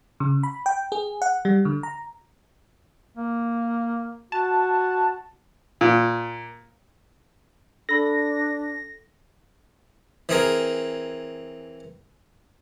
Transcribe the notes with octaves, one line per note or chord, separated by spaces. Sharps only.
C#3
B5
G5
G#4
F#5
G3
D3
A#5
A#3
F#4 A5
A#2
D4 A4 B5 A#6
E3 C4 G#4 A#4